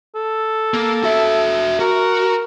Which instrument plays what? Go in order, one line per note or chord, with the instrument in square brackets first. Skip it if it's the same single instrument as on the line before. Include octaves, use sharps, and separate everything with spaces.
[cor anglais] A4
[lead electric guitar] A#3
F#4 E5
[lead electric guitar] F#4 [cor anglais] A#4